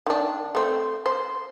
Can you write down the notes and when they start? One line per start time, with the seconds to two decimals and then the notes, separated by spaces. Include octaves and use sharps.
0.06 D#3 D4
0.55 A3 C4
1.06 C5